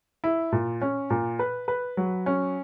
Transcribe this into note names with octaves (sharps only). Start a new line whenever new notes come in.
E4
A#2
C#4
A#2
B4
B4
F#3
C#4